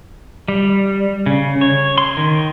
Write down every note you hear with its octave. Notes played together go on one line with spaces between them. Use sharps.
G3
C#3
C#5
C6
D#3